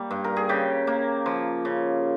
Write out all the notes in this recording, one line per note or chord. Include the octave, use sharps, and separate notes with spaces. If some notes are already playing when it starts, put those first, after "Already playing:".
Already playing: G3 A#3
G2
A#4
G#4
C#3 G4
A#3
F3
C#3